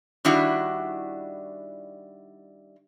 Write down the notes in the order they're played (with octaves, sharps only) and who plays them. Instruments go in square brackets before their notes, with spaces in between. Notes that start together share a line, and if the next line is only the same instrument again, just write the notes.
[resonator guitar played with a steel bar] D#3 G3 D4 E4 F#4